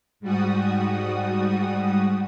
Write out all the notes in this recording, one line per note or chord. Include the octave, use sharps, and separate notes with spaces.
G#2 G3 F#4 D#6